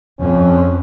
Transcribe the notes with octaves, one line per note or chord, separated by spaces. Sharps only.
F2 C#4